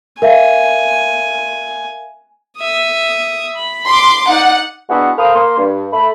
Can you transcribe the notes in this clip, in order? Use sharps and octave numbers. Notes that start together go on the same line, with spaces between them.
A#4 E5 F5 G#5
E5 D#6
B5
C6 D6
D#4 D5 F#5
G#3 B3 D4 E4 F#4
A4 A#4 C5 F5 B5 D#6
A#3 C6
G2
A3 B5